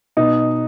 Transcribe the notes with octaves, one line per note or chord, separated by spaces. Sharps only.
B2 D#4